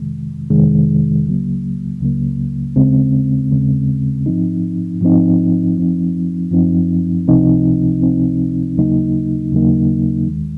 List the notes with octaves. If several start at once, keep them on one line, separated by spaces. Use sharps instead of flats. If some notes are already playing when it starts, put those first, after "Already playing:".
Already playing: F2 C3 D#3 G#3
F2 C3 D#3 G#3
C#2 C#3 F#3 A#3
C#2 C#3 F#3 A#3
D#2 C#3 G#3 C4
D#2 C#3 G#3 C4
G#2 F3 C4 D#4
G#2 F3 C4 D#4
F#2 F3 C4 D#4
F#2 F3 C4 D#4
C#2 C3 F3 C4 D#4
C#2 C3 F3 C4 D#4
D#2 C#3 F#3 A#3 D#4
D#2 C#3 F#3 A#3 D#4
D#2 D#3 G#3